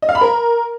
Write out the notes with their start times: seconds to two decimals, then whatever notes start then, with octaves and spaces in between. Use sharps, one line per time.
0.02 D#5
0.09 F5
0.15 B5
0.21 A#4